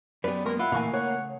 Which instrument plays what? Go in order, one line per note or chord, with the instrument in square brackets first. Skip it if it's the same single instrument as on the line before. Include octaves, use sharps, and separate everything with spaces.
[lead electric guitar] F#2 B3 [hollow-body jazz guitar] G4 B4 [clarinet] D5
[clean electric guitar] G#3 A#3 [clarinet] A#4
[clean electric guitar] E4 [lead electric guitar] F4 [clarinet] F#5
[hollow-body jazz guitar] A#2 E3 [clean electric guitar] C#3 A3 G#5 [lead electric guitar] A#3
[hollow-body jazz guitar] C#5 [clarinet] F#5